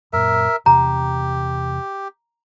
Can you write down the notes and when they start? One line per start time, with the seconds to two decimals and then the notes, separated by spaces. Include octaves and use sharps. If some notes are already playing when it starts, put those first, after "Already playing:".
0.13 F#2 A#2 A#4 E5
0.66 E2 C3 G4 A#5